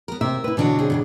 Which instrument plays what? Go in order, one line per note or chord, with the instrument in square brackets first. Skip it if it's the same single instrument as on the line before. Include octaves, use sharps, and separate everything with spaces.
[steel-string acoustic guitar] B3 A#4
[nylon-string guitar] C3 E5 [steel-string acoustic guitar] A#4
[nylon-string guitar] E4 B4
[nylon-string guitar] B2 D3 [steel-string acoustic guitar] E3 D4 F#4
[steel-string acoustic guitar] C4 G#4
G2 A#2 C#3